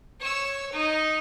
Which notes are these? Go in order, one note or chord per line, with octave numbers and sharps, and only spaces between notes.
C#5 E6
D#4